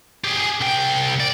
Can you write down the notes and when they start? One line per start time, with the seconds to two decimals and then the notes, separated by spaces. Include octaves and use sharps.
0.24 G4 G#4
0.61 C2 G5
1.20 D5